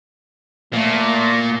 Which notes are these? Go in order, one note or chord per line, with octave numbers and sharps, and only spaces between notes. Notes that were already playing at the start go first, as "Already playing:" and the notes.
A#2 A3